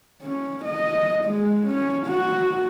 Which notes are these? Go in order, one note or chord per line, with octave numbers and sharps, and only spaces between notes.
C#4
D#5
G#3
C#4
F#4